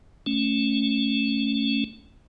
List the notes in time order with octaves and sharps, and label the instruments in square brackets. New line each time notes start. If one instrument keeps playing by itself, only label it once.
[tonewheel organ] A3 C#4